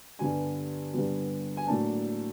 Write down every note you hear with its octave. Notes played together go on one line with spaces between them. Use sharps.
G2 D3 G3 B3 G#5
G2 D3 G3 B3
G#5
A2 F#3 A#3 D4 A5